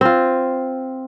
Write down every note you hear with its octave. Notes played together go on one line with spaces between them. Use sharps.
C4 F4